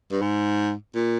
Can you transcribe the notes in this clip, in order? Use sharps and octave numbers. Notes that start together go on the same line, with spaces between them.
G2
G#2
A#2